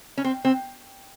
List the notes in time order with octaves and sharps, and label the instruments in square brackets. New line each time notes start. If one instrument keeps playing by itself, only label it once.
[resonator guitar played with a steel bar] C#4
C4
C4